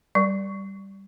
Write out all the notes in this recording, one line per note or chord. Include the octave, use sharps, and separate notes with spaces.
G3